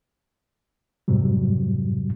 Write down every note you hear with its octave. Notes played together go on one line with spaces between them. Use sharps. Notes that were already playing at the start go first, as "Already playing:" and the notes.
F2 G#2 C3 F#3 G3